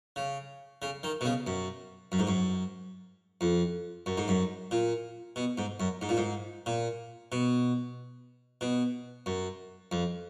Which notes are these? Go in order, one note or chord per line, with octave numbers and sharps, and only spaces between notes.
C#3
C#3
D#3
B2
C#3
F#2
F#2
G#2
F#2
F2
F#2
G#2
F#2
A#2
B2
G#2
F#2
G#2
A#2
G#2
A#2
B2
B2
F#2
F2